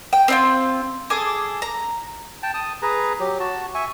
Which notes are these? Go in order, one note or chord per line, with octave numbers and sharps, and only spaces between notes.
G5
C4 D#4 F4
G#4 A4 D6
A#5
G5 A5
A5 D#6
G#4 B4 A#5
F#3 G4
F#4 A5
E5 G#5 C#6